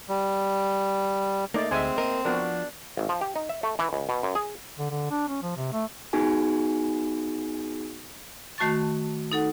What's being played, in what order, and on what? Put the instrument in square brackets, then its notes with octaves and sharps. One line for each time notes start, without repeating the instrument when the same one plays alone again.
[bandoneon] G3
[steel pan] A3 D#4 D5 [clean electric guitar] A#3
[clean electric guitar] D2 [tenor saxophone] G#3 [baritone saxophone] C4 [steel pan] E5 G#5
[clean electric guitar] A#3 A#4 [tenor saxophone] D#5
[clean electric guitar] F3 [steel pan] B3 F#4 A#4 [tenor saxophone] D4
[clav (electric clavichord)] G#1
F3
G4
D#4
E5
A3
E3
C#2
B2
F#2
G#4
[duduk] D3
D3
D4
C#4
F3
C3
A3
[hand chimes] B3 D#4 F#4 G#4 G#5
[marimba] D#3 A3 F#4 A5 C#6 A6
D#4 A4 F#5